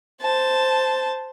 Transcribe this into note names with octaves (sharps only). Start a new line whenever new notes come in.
C5 A5